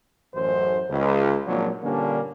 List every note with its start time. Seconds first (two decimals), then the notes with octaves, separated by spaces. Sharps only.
0.34 A1 F#2 C5
0.90 C#2
1.47 G#1 A#2 F3 F#3 A#3 D4
1.83 G2 A#2 D3 A#3 C#4 D4